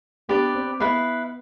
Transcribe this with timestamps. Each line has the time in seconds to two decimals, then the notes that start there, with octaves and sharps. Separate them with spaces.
0.29 B3 D4 G4 B4 D5
0.55 C4
0.80 B3 E4 B4 F5